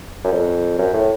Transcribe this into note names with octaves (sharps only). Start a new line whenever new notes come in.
F#2
F2
F#2
A2